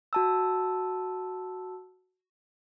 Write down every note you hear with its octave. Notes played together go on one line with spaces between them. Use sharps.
F#4 A5 E6